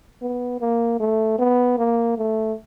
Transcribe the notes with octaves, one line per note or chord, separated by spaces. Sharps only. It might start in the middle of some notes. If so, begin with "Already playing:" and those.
B3
A#3
A3
B3
A#3
A3